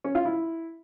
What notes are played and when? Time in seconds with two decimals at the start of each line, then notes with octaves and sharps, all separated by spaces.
0.04 C#4
0.15 F4
0.25 E4